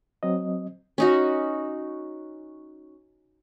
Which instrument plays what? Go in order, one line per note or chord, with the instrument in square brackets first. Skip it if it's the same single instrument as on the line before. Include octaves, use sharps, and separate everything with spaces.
[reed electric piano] F#3 C4 D#5
[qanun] C#4 D#4 F#4